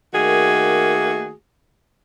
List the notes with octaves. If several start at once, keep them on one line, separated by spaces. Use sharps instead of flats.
D#3 A3 A#3 F#4 G#4